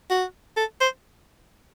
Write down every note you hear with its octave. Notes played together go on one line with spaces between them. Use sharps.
F#4
A4
C5